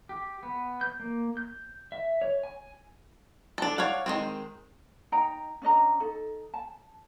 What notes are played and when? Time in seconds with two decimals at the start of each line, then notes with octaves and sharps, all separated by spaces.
0.09 G4
0.43 B3
0.81 G6
1.00 A#3
1.37 G6
1.92 E5
2.22 C#5
2.43 G#5
3.58 D4 A4
3.78 C#5 D5 F5 F#5
4.06 D#3 G#3 C4
5.12 D#4 D#5 G5 A#5
5.62 C#4 D4 D#5 A#5
6.00 D#4 A4
6.54 A5